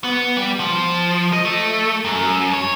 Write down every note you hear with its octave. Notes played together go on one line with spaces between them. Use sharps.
B3
G3
F3
D#5
A3
F#2
C#5